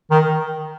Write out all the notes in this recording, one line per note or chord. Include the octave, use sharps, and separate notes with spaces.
D#3